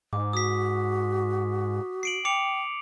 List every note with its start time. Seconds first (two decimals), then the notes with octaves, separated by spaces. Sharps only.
0.13 G#2 D6
0.33 F#4 D#6 B6
2.03 C7 D7 F#7
2.25 G5 D6 C#7 F7